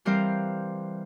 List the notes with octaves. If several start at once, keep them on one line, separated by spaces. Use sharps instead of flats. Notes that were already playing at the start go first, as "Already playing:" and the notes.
E3 G3 C4 A#4 C5 F5